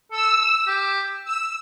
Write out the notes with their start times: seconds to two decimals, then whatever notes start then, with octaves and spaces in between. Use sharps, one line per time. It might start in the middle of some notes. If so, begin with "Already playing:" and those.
0.12 A4 E6
0.68 G4
1.25 E6